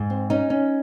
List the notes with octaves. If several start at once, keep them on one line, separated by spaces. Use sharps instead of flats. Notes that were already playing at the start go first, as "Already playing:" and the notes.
Already playing: G#2
C4
C#4 D#4
C#4